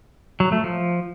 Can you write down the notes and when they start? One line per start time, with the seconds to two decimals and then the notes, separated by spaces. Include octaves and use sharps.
0.40 F#3
0.52 A3
0.64 F3